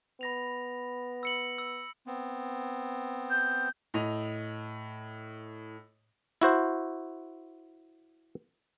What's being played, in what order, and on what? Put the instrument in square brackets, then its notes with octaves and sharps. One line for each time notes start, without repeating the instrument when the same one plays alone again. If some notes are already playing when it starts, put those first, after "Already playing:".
[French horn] B3 [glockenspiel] B5 A#6 F7
[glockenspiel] E6 C#7 F#7
E6
[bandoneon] B3 C4
[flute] G6
[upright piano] A2 D#5 F7
[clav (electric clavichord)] E4 F#4 C5